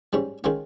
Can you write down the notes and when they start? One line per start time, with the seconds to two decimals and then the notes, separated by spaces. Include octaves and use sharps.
0.13 G#2 G3 C#4
0.44 D#3 G#3 C#4 F4